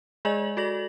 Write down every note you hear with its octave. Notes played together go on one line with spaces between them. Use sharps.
G#3 G#4 D5 D#5 G#5 F#7
F#4 A4 D5 A#6 F#7